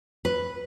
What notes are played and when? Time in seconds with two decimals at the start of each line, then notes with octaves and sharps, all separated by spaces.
0.25 B4